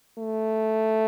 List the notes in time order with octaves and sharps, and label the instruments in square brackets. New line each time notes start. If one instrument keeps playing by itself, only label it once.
[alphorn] A3